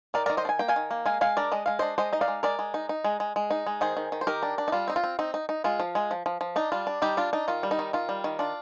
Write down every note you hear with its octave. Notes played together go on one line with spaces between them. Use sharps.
D#3 A#4 D5
D#3 A#4 D5
C5 D#5
D4
G#5
A#3 G5
F5 G#5
D#3
A#3
G#3 F5 G#5
G#3 F5 G#5
D4 A#4 D5
G#3 D#5
G#3 F5
D4 C5 D#5
G#3 C5 D#5
D#4 D#5
D5 F5
G#3
G#3 A#4 D5
G#3
D#4
D#4
G#3
G#3
G#3
D#4
G#3
D#3 G#4 C5
D#3
D#3
C5
D#3 G4 A#4
D4
D4
D#4
G3 F4
C4 D#4
F4
C4
C4 D#4
D#4
D#4
G#3 F4
F3
G#3
F3
F3
F3
D4 D#4
G3 F4
D4
G3 D#4 G4
D4 F4
D4 D#4
D#3 F4
G3
D#4
D#3
D#3 F4
G3
D#3
D4 F4